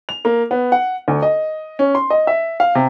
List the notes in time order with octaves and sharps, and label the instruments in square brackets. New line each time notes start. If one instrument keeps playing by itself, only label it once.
[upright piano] F7
A#3
B3
F#5
D2
D#5
C#4
C6
D#5
E5
F5
C3